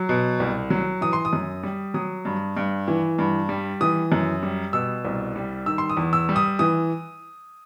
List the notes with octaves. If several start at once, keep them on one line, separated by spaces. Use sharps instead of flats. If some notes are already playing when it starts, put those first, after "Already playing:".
Already playing: F#3
B2
C2
F#3
E3 D#6
C6
D#6
F#2
G3
F#3 D#6
G2
G2
E3
G2
G3
E3 D#6
F#2
G3
B2 E6
C2
G3
D#3 E6
C6
D#6
E2
E6
G3
D#6
E3 D#6